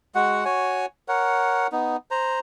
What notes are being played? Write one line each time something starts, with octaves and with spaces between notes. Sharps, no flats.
G#3 F#4 F#5
F#4 C#5 G#5
A#4 C#5 F#5
B3 D#4
C5 A#5